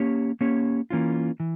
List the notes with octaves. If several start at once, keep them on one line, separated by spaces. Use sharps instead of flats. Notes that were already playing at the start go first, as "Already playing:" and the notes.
Already playing: A#3 C#4 G4 C#5
A#3 C#4 G4 C#5
E3 A#3 C#4 F4
E3